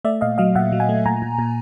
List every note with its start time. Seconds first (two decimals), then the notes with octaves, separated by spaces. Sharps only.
0.04 A3 D5 E5
0.21 A#2 D#5 F5
0.38 F#3 D#5 F5
0.55 A#2 E5 F#5
0.72 F#3
0.80 F#5 G#5
0.89 A3
1.06 A#2 G#5 A#5
1.22 A#2
1.39 A#2